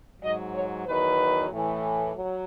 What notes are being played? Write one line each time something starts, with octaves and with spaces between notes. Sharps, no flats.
G#2 F#3 D#5
C#5
E2 D#3 F#3 B4
A2 E3
F#3